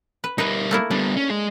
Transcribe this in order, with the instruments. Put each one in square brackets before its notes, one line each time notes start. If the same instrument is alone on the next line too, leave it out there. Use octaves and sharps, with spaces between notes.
[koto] B4
[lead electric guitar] G3 A#4 [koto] D#4 B4
[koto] A3 A#3 E4
[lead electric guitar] G3 B3 [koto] D4
[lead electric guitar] C#4
G#3 G#4